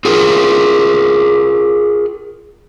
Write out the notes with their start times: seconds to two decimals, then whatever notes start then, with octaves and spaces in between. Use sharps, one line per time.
0.05 F4 G#4 A#4